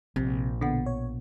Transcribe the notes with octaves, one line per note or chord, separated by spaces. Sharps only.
A#1 C3
B2 D3 B3 F#5
C#5